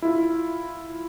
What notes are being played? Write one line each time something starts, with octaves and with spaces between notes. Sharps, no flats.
E4 F4